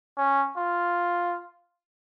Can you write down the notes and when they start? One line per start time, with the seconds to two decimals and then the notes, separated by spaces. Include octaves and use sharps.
0.17 C#4
0.57 F4